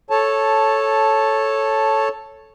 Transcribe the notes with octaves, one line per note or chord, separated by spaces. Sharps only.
A4 C#5 A5